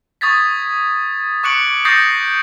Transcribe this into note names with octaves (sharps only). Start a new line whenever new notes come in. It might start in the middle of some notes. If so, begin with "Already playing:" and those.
C#6 D#6 G#6 A6 B6
C#6 D6 F#6 C#7 D7 F#7
C#6 D#6 G6 A6 A#6 C7